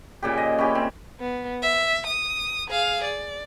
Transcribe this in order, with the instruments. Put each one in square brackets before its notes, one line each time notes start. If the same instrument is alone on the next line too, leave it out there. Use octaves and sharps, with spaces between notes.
[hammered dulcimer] A#2 C#3 G4
D#5
C#4 E4 G4
C4
[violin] B3
E5
D#6
G#4 F5
D5